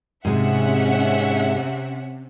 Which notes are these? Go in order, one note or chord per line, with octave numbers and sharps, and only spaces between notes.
G#2 C3 G#3 C#4 E5 F#5